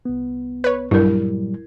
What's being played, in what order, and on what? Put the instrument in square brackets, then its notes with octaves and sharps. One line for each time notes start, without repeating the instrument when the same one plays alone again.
[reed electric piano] C2 B3
[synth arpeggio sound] B4 C#5
[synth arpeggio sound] G2 [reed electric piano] A#2 F#3 G3 [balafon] E4 A#4